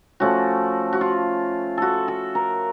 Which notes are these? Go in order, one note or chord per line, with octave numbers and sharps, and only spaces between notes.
F3 A3 C#4 F#4
F#4
F4
F#4 A4
A4
A#4